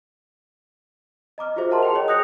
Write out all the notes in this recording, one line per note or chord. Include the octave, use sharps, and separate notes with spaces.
D#5 A#5 D6 F6
F4 F#4 G#4 C5 E5
A#4 D#5 F#5 A5 A#5 C6
G#4 G5 F7
G#4 C#5 D#5
D#6 F#6 G6 A#6 C#7 F7